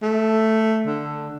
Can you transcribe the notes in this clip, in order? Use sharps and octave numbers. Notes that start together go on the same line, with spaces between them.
A3
D3